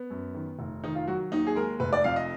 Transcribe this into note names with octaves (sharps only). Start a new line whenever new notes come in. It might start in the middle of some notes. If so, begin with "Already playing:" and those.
Already playing: B3
F#2
D#3
F1
D#3 D#4
F4
F#3 F#4
D#2 D#4
G#4
G#3 A#4
F1 B4
D5
F2 F5
D#5